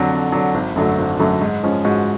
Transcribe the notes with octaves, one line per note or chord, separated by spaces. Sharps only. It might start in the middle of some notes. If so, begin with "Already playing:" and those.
Already playing: F2 D3 F#3
F2
D3 F#3
G#1
F#2 D3 F#3 A3
G#1
F#2 D3 F#3 A3
G#2
F3 G#3 C#4
G#2 F#4